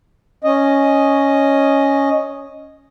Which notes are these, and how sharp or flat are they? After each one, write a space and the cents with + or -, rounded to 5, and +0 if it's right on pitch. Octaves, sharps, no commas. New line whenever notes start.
C#4 +0 D#5 +0